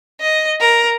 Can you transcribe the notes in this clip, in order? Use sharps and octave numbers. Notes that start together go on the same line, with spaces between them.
D#5
A#4